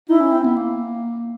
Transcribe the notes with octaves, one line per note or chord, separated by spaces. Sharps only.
D#4 E4
C#4
C4
B3
A#3